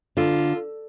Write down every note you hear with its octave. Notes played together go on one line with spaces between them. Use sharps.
D3 F4